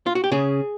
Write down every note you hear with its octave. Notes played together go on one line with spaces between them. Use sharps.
F4
F#4
G4
C#3 G#4